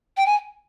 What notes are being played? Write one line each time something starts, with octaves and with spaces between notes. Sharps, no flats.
G5
G#5